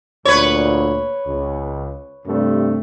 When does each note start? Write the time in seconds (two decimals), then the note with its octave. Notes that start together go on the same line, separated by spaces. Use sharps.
0.25 D2 A#2 B4 C#5
1.26 C#2
2.26 G2 C3 A3